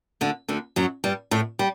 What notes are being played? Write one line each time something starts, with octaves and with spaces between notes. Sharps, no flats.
D2 D3
D2 D3
F#2 F#3
G2 G3
A2 A3
G3